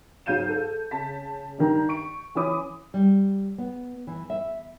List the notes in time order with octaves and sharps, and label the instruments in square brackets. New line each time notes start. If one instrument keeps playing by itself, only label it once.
[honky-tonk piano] G#2 F#3 F5 G6 D#7 E7
A4
C#3 A5 B6
G2 D#3 A#5
C#6 D7
E3 C#4 B5 D6 D#6
[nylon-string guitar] G3
B3
E3
E5